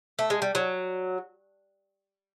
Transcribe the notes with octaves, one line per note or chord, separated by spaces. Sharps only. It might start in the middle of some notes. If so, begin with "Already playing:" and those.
A3
G#3
G3
F#3